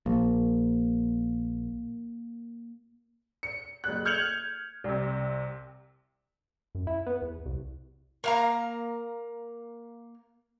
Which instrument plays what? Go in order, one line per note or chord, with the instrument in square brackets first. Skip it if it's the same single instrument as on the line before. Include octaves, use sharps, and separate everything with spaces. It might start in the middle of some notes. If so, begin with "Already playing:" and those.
[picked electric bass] A#1 [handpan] A#3
[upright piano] C#7
F#1 F#6
F6 G6 G#6 C#7 F7 F#7
C2 C3
[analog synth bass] F#2
E4
B3
E2
C2
[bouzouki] A#3 F5 A#5